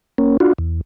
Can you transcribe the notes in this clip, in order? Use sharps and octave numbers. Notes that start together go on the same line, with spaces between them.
A#3 C#4
D4 F4 F#4
E2